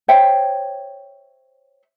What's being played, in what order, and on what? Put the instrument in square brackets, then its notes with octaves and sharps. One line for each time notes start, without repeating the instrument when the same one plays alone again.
[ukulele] C5 C#5 E5 G5